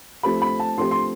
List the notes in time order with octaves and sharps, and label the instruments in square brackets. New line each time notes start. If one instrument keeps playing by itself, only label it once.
[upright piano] F3 A3 C4 G4 [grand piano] B5
[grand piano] B5
A5
[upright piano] F3 A3 C4 G4 [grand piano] C6
[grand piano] C6